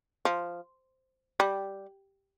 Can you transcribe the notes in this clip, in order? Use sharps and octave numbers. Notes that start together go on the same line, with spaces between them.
F3
G3